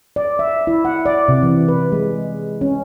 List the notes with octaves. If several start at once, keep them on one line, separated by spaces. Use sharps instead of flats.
D5
E5
E4
F#5
D5
C3
E3
B4
G#3
C#4